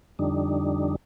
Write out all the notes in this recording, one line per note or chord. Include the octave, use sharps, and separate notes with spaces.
F2 D3 G3 D4 D#4